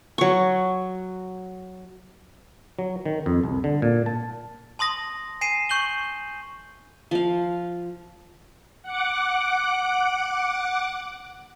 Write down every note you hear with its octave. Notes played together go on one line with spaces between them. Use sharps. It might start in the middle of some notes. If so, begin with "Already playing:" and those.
F#3 C#6
F#3
D#3
F2
C2
D3
A#2
A5
A5 C6 D#6 A#6
G#5 C7 D#7 E7
C#6 G6 F#7 G7
F3 F5
F#5 D6